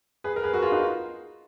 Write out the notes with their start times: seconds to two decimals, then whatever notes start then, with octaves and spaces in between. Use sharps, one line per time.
0.24 G#4 B4
0.36 A#4
0.43 G#4 B4
0.53 F#4 A#4
0.62 F4 G#4
0.72 D#4 F#4